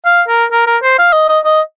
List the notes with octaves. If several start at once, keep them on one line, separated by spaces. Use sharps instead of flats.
F5
A#4
A#4
A#4
C5
F5
D#5
D#5
D#5